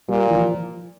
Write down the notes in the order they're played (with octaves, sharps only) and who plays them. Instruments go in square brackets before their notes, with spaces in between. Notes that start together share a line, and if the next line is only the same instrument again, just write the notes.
[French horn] A#2 [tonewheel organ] G3
[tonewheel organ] E3
F3